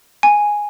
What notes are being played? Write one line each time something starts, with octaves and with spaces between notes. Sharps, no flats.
G#5